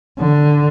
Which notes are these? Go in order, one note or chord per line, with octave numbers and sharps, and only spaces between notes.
D3